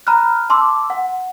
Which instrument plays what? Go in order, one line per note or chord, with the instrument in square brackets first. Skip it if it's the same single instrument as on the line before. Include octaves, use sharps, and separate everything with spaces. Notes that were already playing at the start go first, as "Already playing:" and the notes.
[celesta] A#5 B5 F6 F#6
A5 C6 D6 E6
F#5